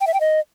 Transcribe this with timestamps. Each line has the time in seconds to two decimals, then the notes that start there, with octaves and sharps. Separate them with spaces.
0.01 G5
0.07 E5
0.14 G5
0.21 D#5